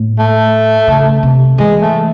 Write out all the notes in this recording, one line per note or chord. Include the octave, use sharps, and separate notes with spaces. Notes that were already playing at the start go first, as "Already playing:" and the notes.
Already playing: A2
A3
C#3
C3
E3 G#3
A3